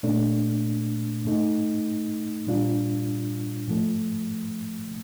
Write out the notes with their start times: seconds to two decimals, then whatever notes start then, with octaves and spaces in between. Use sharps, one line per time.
0.03 A#2 A3 D4
1.25 A2 A3 D#4
2.47 A#2 G3 D4 F4
3.68 A2 F3 A3